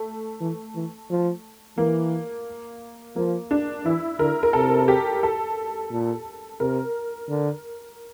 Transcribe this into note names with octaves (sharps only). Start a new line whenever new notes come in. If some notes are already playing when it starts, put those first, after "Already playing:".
Already playing: A3
E3
E3
F3
E3 A#3
F3 A#3
D4
E3 E4
D3 A#4
A#4
C3 A4
G4
A4
A#2
C3 A#4
D3